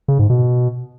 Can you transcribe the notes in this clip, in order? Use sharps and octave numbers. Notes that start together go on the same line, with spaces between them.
C#3
G#2
B2